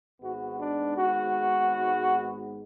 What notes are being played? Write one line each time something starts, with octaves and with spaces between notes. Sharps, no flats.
G#1 G#2 G#3 B3 F#4
D4
F#4